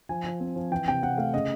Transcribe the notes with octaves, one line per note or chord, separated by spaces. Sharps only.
F3 G#5
F3
C4
F3
E3 G5
C3 G5
C3 F#5
A3 F5
C#3 D#5